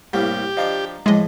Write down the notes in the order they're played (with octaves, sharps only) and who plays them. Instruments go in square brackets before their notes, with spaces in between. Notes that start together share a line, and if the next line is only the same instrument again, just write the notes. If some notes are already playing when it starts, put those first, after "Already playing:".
[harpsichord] C2 A2 A#3 [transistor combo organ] G4
[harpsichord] F3 D4 [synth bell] D#5 F5 A#5
[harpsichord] A2 [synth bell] F3 G#4 D6 [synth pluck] G#3 D#5